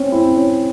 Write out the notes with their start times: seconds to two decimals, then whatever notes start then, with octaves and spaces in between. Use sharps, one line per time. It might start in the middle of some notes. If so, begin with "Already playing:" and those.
Already playing: C4 C#4
0.12 C4 E4
0.36 C#4